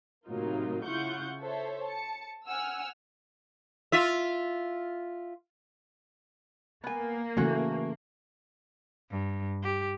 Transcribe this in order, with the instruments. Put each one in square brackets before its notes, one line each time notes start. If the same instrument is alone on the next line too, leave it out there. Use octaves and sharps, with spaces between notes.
[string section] A2 C3 F#3 A#3 D#4 F4
C#3 E4 F4 F#5 C#6 G6
A4 C5 C#5 E5
A5 C#7
F#5 G#5 E6 F6
[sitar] F4 E5
[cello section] A#3 [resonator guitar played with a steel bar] B3 G#5
[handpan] C#3 E3 A3 [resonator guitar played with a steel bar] C#4 F#4
[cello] G2
G4